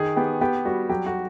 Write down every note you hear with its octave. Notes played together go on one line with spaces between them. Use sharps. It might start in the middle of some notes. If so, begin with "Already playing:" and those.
Already playing: D#3 G#4
B3 G4
B3 G4
G3 F#4
F#3 G4
F#4